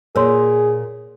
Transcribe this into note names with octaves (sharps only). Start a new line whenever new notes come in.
A#2 G#4 A#4 C#5 C6